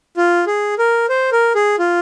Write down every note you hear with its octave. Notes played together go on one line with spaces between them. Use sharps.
F4
G#4
A#4
C5
A#4
G#4
F4